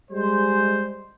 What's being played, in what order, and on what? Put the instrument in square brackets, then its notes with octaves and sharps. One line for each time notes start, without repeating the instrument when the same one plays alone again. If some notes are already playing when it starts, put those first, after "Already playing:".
[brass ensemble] G3 G#3 C5